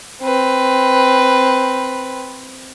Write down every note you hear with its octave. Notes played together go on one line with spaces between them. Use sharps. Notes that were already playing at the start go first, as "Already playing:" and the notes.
C4 B4